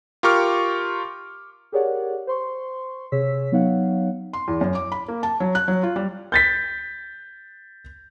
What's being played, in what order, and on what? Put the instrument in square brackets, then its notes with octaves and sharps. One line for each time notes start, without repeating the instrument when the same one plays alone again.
[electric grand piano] F4 G4 A#4 C#6 D6 F6
[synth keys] G4 G#4 A#4 C#5 D5 F#5
C5 C6 C#6
C3 G#4 C#5 E6 B6
F#3 B3 D#4 C#5 F5 F#5
[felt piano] C6
E2
F#2
D6
B5
A#3
A5
F#3
F#6
F#3
F4
G3
[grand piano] G6 A6 B6